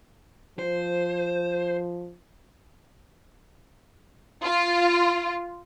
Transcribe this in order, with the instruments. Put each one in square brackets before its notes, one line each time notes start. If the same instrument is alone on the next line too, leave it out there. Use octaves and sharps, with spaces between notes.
[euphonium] F3 [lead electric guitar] C5
[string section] F4